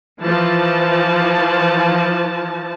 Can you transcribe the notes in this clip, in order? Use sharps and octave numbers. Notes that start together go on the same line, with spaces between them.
E3 F3 A5